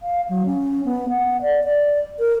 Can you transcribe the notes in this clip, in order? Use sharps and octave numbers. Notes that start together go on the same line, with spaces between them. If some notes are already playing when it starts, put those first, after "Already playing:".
F5
F#3
C#4
B3
F#5
D5
D5
A#4